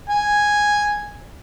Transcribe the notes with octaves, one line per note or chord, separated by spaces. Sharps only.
G#5